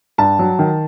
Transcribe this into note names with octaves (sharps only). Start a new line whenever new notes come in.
G2 A5
F#3
D#3